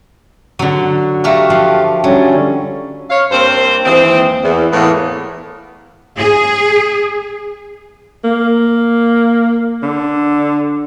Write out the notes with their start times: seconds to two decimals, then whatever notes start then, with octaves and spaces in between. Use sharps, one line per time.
0.59 D3 F#3
1.24 A3 F#4 G4 A#4 F5
1.50 F3
2.04 D3 F#3 G3 C#4
3.10 C#5 F5
3.32 G2 A#3 C4 C5
3.86 D#2 E3 G#3 C4
4.43 E2
4.73 A2 E3 A#3 B3
6.18 G#4
8.24 A#3
9.83 D3